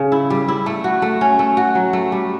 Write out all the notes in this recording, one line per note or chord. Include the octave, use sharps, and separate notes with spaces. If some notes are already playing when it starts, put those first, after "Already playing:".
Already playing: C#3
E4
G3
E4
A3
F#4
A3
C#4
A3
F#4
F#3
A3
G3